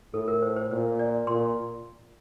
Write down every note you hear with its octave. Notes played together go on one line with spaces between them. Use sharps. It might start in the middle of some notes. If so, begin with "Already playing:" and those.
A2 A4
A#4
C5
C5
A#2 C5
D5
A#2 C6